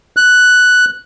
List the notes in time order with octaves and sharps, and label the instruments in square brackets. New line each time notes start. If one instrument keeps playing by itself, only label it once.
[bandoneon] F#6